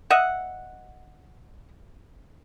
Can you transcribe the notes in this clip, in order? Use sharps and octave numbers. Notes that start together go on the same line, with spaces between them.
D#5 E5 F#5